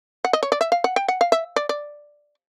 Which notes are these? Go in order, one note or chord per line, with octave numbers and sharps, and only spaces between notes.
F#5
D#5
C#5
D5
E5
F5
F#5
G5
F#5
F5
E5
D5
D5